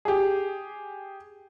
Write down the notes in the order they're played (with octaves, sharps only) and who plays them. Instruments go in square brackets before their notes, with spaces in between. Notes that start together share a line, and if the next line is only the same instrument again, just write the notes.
[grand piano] G4 G#4